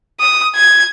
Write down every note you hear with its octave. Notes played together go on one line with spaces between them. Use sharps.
D#6
G#6